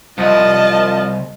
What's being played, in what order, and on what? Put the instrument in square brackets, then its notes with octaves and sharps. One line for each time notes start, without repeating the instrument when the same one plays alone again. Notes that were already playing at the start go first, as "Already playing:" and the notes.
[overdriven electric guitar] C2 [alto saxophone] F3 [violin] D#5 A5